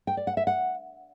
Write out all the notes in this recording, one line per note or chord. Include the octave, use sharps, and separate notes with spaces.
G5
D5
F#5
E5
F#5